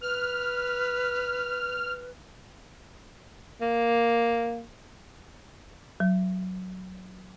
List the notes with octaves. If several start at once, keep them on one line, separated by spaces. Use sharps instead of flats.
B4 F6
A#3
F#3